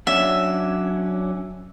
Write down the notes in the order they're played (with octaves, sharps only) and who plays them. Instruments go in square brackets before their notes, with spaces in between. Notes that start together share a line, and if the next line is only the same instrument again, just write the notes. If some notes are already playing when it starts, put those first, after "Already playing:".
[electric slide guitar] F#3 C#4 D4 [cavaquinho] E5